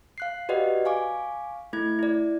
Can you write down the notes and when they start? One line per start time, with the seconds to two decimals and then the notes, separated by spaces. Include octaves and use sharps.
0.18 F5 F#6 C7
0.49 F#4 G4 B4 D5 D#5 F#5
0.85 F5 G#5 C#6 D6
1.73 A3 E4 G#6
1.99 E4 D5